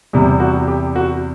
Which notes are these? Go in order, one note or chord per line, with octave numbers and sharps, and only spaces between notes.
E2 C3 G3
F#4
G4
F#4